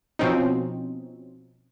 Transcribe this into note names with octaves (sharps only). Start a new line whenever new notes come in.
B2 F3 C4 C#4 D#4